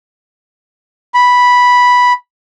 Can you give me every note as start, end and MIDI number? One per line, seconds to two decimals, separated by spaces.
1.14 2.13 83